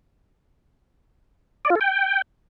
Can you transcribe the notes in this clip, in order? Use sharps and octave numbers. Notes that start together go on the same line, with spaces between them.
D5
F4
A4
G5